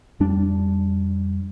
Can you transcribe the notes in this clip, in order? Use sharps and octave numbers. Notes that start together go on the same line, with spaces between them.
F2 G3 D4